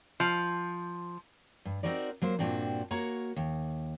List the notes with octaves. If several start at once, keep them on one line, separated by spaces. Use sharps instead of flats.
F3
G2
C4 C#4 D#4 F#4 A#4 D5
F#3 A#3 C5
G2 A#2 C4 D4 F#4
A#3 F#4 C#5 A#5
D#2